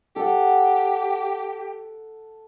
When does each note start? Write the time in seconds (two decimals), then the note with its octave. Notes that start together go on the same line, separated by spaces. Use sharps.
0.16 G4 A4 F#5